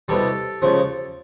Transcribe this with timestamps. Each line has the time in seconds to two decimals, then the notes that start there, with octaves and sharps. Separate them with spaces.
0.08 C2 B2 G3 G4 A4
0.62 C#2 C#3 F3